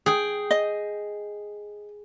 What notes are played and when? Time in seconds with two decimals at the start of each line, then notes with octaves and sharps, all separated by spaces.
0.06 G#4 G5
0.51 D#5